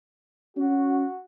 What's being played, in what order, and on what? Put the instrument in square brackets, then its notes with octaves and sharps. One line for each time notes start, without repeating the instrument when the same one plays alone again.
[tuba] C#4 [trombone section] F#4